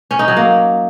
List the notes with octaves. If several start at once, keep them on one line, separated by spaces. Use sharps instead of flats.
C#4
D#4
F#3
A#3